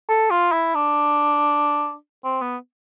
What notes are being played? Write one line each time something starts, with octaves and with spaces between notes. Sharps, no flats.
A4
F4
E4
D4
C4
B3